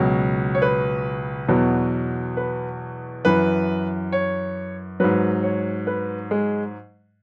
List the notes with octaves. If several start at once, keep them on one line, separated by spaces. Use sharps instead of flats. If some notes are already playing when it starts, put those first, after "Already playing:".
Already playing: C#2 B2 F#3
C#5
B4
E2 B2 F#3
B4
F#2 E3 B4
C#5
G#2 F#3 B4
C#5
B4
G#3